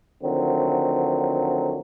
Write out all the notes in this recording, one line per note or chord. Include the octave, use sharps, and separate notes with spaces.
D3 D#3 F3 F#3 A3 C4